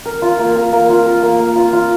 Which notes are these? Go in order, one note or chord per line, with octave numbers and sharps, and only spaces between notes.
A#4
F4
A#3
A#4
A#3
F4
A#4
A#3
A#3
F4
F4